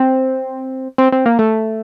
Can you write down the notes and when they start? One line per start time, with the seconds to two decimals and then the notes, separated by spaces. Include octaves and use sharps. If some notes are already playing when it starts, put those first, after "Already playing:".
Already playing: C4
0.98 C4
1.12 C4
1.26 A#3
1.39 A3